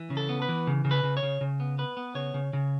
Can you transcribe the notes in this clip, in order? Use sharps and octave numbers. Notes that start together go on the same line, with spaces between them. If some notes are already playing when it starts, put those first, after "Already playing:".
Already playing: E3
C#3
A4
B3
B4
E3
C#3
C#3
B4
C#3
C#5
C#3
C#3
B3
B3 B4
B3
C#3 C#5
C#3
C#3